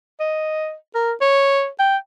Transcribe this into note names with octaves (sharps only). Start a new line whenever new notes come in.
D#5
A#4
C#5
G5